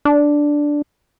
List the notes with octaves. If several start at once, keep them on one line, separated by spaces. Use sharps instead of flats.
D4